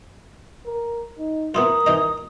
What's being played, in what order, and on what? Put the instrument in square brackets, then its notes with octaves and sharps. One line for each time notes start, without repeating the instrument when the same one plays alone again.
[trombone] A#4
D#4
[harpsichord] B3 E4 F4 [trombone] A#4 [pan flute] D#6
[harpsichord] E3 D#4 D#5